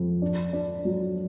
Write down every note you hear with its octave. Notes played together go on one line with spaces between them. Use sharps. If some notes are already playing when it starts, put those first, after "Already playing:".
Already playing: F2
D4
D4
F#3